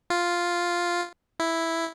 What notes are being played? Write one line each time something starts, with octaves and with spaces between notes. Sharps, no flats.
F4
E4